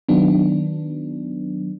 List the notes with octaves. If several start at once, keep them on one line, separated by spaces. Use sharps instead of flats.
D#3 F#3 B3 D4